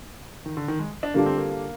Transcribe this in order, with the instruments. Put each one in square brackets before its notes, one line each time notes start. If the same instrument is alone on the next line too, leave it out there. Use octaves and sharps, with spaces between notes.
[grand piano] D#3
D3
D#3
G#3
D4
[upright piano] D3 G3 D4 F4 [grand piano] A#3
[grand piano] C4
A#3
A#3